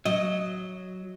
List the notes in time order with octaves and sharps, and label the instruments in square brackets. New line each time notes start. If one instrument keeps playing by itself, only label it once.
[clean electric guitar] F#3 [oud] D#5